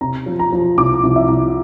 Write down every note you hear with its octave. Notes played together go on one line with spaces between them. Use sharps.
C3 A#5
F3
A#5
F3
C2 D6
C2
E5
C2